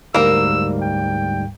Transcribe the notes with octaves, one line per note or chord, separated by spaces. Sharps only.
D2 G#2 G3 A#3 A#4 E6
G5